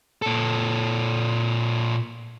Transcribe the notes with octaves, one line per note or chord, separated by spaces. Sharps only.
A#2 A4